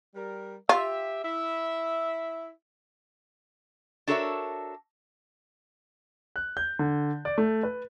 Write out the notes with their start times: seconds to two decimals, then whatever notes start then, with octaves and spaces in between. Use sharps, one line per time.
0.15 G3 A#4
0.69 F4 G4 E5
1.23 E4 E5
4.08 D4 F#4 A4 A#4 C#5 E5
6.36 F#6
6.57 G6
6.79 D3
7.25 D5
7.38 A3
7.63 B4